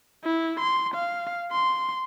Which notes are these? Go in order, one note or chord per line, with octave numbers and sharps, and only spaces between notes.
E4
C6
F5
C6